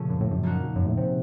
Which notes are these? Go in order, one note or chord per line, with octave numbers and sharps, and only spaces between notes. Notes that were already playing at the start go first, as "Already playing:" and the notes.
Already playing: A#2 C#3 F3 A3 C#4
F#2
A2
F#2
F3 A#3 D#4 F#4
F#2
A2
C3